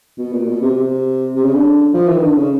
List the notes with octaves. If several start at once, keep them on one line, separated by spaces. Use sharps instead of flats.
B2
A#2
B2
C3
C3
C3
C#3
D3
F3
E3
D#3
D3
C#3